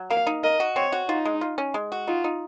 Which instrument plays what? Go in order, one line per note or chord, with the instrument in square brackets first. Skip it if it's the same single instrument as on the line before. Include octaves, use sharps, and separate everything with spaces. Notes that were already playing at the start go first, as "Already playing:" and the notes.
Already playing: [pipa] F#3
[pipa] A#3 [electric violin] F5
[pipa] D#4
[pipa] A#4 [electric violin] D#5
[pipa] F#4
[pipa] C4 [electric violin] C#5
[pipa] F#4
[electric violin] D#4 [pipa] F4
[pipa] G#3
F4
C#4
G#3
F#4
[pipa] D#4 [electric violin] F4
[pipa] D#4